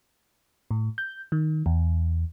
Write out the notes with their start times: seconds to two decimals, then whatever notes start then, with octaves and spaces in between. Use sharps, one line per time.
0.71 A2
0.98 G6
1.32 D#3
1.66 E2